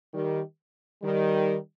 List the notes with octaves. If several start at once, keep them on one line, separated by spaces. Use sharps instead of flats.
D#3 G3
D#3 G3